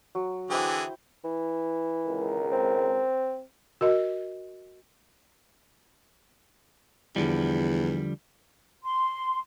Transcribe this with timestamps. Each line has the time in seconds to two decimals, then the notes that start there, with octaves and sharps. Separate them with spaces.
0.15 F#3
0.50 D3 E3 E4 G#4 C5 G5
1.24 E3
2.06 G#1 C#2 A#4
2.52 C4
3.81 F#4 A#4 D#5
7.16 E2 D3 F3 G3
8.84 C6